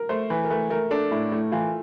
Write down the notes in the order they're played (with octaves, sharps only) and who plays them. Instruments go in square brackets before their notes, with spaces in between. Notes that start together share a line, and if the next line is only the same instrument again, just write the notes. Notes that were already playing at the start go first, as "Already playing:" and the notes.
Already playing: [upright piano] A#4
[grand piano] A3 [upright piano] C5
[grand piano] E3 [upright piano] B4
[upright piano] A#4
[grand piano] A3 [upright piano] B4
[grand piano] A3 [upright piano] A#4
[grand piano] D4 [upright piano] A4
[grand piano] A2 [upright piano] E4
[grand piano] A3 [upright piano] E4
[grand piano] E3 [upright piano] F4